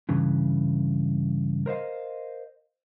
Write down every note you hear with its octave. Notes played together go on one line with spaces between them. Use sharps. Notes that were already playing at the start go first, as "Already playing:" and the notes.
G2 C#3 E3
A#4 C5 D#5 F5